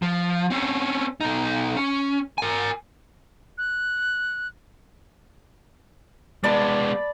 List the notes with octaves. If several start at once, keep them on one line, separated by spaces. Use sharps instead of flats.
F3
C4 C#4
B2 D#4
C#4
A#4 G#5
F#6
G#3 B3 D5 A5 B5